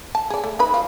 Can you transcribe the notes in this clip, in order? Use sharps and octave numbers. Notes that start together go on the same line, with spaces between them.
A5
G#4 D5
A3
D#4 B4 B5
F#3 F4